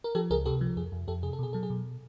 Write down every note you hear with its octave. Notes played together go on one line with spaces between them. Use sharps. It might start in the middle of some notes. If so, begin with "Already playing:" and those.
A#4
F3 G4 A4
C#2 G#4 A#4
C3 G4 A4
F3
F2 G#4
F2
F2 G4 A4
C3 G#4
A4
B2 G#4
F#3 A4
G#4
B2